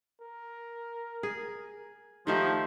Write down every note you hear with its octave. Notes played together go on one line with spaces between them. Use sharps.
A#4
G#4
D#3 F3 A3 D#4 G4